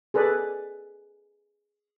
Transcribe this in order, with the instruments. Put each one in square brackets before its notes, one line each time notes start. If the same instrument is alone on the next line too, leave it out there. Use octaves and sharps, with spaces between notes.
[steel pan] G#4 A4 B4 D5